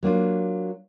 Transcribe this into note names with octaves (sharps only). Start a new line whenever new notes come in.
F#3 A#3 D4 F4